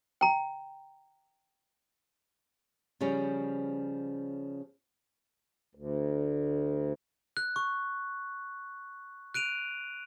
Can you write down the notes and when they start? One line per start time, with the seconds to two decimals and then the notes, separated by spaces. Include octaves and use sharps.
0.21 G5 A#5
3.01 C#3 F3 G3 C#4
5.75 D2
7.37 F#6
7.56 C#6
9.34 F#6 D7 D#7 F7